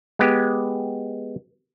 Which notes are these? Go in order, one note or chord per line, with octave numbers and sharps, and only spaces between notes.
G#3 B3 G4